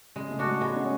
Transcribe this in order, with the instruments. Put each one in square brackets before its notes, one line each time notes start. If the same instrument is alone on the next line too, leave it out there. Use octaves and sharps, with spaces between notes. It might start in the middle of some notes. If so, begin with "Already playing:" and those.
[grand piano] C#3 [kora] G#3
[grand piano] A3
[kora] D4 F#4 A4
[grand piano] G#3
[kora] G#3 [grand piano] B3
[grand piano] C#4